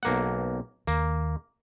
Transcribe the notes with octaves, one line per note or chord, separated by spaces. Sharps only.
B1 A#3 F#5
D#2 A#3